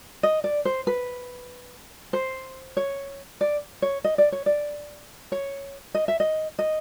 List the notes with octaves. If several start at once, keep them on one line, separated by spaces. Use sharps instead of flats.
D#5
D5
C5
B4
C5
C#5
D5
C#5
D#5
D5
C#5
D5
C#5
D#5
E5
D#5
D#5